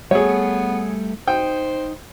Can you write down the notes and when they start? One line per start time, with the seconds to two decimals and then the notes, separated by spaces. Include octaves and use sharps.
0.11 G3 A3 B3 G#4 A4 C#5
1.27 D#4 C5 G5